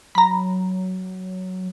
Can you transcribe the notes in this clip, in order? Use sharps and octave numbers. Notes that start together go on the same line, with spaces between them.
F#3 A#5 B5